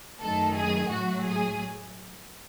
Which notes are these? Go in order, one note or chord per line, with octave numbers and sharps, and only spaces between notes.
F#2 D#3 A3 A4
G#4
A2 F#3 A3 F#4
G#4